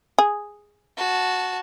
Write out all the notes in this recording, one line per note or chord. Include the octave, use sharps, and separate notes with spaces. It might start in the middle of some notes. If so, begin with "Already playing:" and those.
G#4
F#4 A5